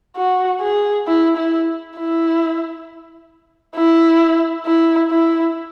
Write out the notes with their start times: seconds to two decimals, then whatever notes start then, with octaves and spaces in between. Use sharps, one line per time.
0.16 F#4
0.61 G#4
1.07 E4
1.37 E4
1.97 E4
3.76 E4
4.66 E4
5.10 E4